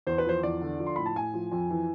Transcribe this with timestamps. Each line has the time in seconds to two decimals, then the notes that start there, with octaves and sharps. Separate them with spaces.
0.07 E2 C5
0.18 B4
0.25 F3 C5
0.43 E2 D5
0.61 D3
0.79 F3
0.86 C6
0.96 A2 B5
1.06 A5
1.15 A2 G#5
1.34 F3
1.52 F2
1.70 E3